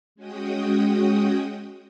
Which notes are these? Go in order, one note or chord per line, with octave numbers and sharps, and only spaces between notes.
G#3 C#4 F#4 G5 D#6